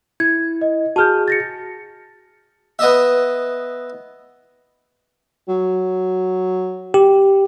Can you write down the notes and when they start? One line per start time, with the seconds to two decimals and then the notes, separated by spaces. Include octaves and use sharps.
0.20 E4 G#6
0.61 D#5
0.96 F#4 G#4 A5 F6 G6
1.28 A6 A#6 C#7
2.79 B3 D#5 E5
5.49 F#3
6.94 G4